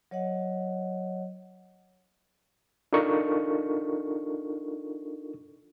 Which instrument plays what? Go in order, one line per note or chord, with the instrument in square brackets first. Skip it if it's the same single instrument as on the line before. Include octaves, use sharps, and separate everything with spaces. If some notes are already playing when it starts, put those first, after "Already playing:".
[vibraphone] F#3 C#5 D#5 F#5
[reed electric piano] D4 D#4 F4 A4 A#4 C#6